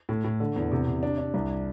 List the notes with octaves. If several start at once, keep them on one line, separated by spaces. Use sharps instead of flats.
A2
A2
D3
E2
C3
C3
D4
D4
C2